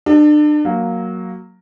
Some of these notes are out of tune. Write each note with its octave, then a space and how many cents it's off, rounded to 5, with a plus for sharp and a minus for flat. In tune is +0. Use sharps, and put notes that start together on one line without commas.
D4 +35 A4 +0
F#3 +0 A#3 +0